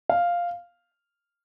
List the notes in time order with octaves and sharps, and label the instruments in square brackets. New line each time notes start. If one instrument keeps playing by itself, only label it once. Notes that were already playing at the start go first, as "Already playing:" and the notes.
[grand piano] F5